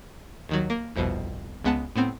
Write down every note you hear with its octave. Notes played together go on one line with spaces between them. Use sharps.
D#2 D#3 F#3
A#3
G1 C2 F2 B2
C#2 G#3 B3 F#5 A5
A2 B3 C4